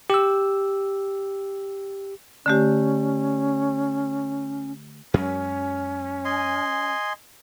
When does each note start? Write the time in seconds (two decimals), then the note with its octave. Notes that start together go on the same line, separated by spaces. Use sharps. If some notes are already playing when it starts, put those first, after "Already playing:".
0.10 G4 E6
2.46 D3 A3 C#4 G4
5.14 F#2 F#3 G#3 C#4
6.25 D#5 G#5 C6